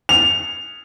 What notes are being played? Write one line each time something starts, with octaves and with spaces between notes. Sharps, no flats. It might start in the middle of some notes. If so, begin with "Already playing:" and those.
F7